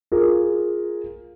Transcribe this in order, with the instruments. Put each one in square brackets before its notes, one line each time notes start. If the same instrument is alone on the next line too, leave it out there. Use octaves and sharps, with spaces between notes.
[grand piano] F4 G#4 A#4